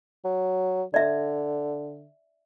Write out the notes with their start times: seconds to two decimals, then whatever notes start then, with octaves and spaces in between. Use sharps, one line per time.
0.25 F#3
0.94 D3 D5 E5